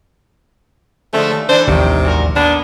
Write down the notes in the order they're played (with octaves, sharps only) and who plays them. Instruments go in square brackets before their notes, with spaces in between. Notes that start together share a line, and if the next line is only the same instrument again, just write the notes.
[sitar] D3 F3 G#3 [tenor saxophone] A3
[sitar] D#2
[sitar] E3 D4 [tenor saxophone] C5
[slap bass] A1 D#2 F3 [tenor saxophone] C3 [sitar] D#3
[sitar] A#2 F#4 A#4
[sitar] B2 A#3 B3 [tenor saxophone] D4